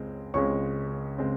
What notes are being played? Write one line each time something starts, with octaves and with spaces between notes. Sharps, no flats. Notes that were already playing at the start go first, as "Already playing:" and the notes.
Already playing: C#2 C#3 G#3 C4
C#2 C#3 G#3 C4 C#5 C#6
C#3 G#3 C4